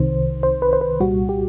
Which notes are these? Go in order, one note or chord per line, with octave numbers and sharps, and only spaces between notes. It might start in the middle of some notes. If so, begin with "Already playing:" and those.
Already playing: C2 C3 D#3 C5
C5
B4
C5
B4
C2 A#2 G3 F#4
G4